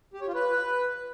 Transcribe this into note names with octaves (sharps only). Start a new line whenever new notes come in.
G4
C#5
F4
B4